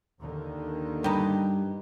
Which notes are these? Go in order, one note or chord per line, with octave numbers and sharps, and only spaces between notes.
D#2 D3 D#3
G2 D#4 G4